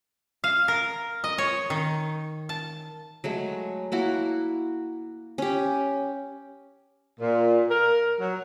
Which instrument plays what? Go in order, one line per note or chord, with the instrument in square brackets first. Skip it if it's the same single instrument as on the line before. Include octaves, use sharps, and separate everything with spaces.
[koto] F5
A#4
D#5
C#5
D#3
A5
[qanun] F#3 G#3 A3
A#3 E4 F#4
C#4 G4
[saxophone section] A#2
A#4
F#3